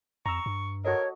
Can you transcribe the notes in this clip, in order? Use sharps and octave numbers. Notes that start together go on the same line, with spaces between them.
F2 A#5 C#6 E6
G2
F#4 A4 A#4 C#5 D#5